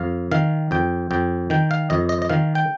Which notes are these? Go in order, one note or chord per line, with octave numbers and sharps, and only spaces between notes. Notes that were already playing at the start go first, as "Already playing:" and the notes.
Already playing: F2 F5
D#3 F5
F2 G5
F2 G5
D#3 G5
F5
F2 D#5
D#5
D#5
D#3 F5
G5